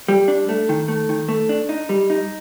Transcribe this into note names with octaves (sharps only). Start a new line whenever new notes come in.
G3
D4
A3
D#3
A3
D#3
A3
D4
D#4
G3
D#4